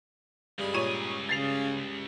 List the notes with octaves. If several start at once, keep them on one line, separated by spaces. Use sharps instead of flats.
C#2 G2 G3 G#3 G#4
A#2 C#5 D#7
C#3 A6 C7 F7